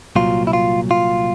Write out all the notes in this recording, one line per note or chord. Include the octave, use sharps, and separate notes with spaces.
C2 A#2 F#3 F4
E4
F4
F4